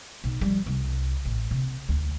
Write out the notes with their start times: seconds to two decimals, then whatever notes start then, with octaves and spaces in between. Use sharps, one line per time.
0.24 B1
0.41 F3 G3
0.66 C2
1.25 A1
1.51 C3
1.89 D2